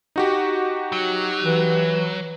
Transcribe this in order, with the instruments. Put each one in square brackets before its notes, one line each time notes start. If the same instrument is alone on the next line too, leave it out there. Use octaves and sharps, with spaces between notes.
[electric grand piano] D#4 F#4 G4
[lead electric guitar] F#3
[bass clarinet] E3